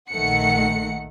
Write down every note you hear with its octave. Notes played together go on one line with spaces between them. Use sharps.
A#1 D#3 A3 F#5 C#7